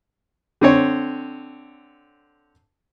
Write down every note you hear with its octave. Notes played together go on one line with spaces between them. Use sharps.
D3 C4 C#5